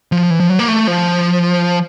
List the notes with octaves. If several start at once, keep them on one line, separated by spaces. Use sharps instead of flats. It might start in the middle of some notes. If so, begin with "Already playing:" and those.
F3
E3
F3
F#3
A#3
A3
F3